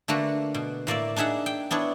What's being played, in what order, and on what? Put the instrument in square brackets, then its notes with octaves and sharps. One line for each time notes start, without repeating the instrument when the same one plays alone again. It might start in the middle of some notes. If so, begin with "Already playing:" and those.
[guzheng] D3 A3 A#3 F#4 B4
B2
A2 A#3 D5 E5
D4 D#4 G#4 E5 F#5
G5
B3 D4 E4 C#5